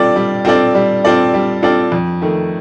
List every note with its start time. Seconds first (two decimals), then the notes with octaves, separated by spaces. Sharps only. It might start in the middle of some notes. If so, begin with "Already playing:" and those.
Already playing: G3 C4 F4 A4 D5
0.16 G3
0.45 C4 F4 A4 D5
0.75 G3
1.05 C4 F4 A4 D5
1.34 G3
1.63 C4 F4 A4 D5
1.92 F2
2.22 D#3 A3